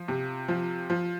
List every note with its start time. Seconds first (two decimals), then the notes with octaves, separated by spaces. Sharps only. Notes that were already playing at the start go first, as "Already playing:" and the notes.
Already playing: F3
0.08 C3
0.48 F3
0.90 F3